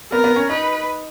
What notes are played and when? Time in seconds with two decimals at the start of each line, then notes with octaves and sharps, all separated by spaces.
0.12 B3 A#4
0.24 B3
0.36 C#4
0.49 D#4 B4